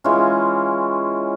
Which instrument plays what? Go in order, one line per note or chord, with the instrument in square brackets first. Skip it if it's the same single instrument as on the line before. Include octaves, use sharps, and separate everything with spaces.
[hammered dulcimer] E3 G#3 C#4 F4